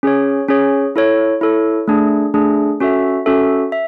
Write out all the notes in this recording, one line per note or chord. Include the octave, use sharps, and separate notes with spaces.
C#4 G#4 C#5
C#4 G#4 C#5
E4 A4 C#5
E4 A4 C#5
A3 D4 G#4
A3 D4 G#4
C#4 F#4 A4 E5
C#4 F#4 A4 E5
E5